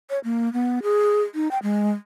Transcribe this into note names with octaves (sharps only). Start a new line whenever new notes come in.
C#5
A#3
B3
G#4
D#4
G5
G#3